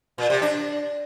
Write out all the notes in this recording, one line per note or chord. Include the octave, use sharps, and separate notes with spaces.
A#2
C3
D4